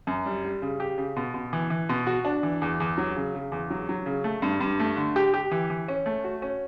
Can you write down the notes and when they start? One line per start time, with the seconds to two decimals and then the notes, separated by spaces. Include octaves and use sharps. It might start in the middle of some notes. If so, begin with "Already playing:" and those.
0.07 F#2
0.26 G3
0.44 G3
0.62 C#3
0.80 G4
0.98 C#3
1.16 B2
1.34 B2
1.53 E3
1.70 E3
1.89 B2
2.07 F#4
2.25 D4
2.43 E3
2.62 E2
2.80 E2
2.98 F#3
3.16 C#3
3.35 C#3
3.52 E2
3.70 F#3
3.89 F#3
4.06 C#3
4.24 A3
4.42 G2
4.60 G2
4.79 A3
4.97 D3
5.16 G4
5.34 G4
5.51 E3
5.70 E3
5.88 C#4
6.06 A3
6.24 F#4
6.42 C#4